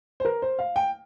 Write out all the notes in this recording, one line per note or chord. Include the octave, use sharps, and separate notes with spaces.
C5
A#4
C5
F5
G5